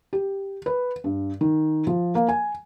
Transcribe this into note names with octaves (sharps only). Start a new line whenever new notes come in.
G4
B4
G2
D#3
F3
A#3
G#5